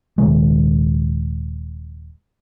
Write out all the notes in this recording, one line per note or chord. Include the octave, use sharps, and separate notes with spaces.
D#1 C3 D#3 G#3